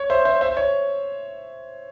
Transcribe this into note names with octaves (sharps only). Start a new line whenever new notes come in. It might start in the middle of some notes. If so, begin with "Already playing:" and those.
Already playing: C#5
C5 E5
C5 E5
C5 E5
C#5